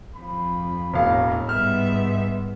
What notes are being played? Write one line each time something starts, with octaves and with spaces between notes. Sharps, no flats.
F2 F3 B5
E1 A2 G#3 F5
G#2 G3 B3 E5 F6